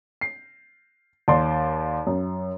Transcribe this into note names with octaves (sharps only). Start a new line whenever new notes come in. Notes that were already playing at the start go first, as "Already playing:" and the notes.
C7
D#2 D5 C6
F#2